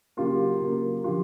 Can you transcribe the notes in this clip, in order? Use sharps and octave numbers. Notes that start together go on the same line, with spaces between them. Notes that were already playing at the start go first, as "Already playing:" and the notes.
C#3 F#3 A#3 F4 G4
C#3 F#3 A#3
D3 F3 F4 G4